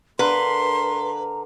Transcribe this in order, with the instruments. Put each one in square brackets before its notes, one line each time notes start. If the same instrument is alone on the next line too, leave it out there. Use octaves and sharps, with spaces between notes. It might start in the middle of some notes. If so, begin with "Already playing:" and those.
[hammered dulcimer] D3 A#4 F5 [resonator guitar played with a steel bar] B4 [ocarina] A#5 [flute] C6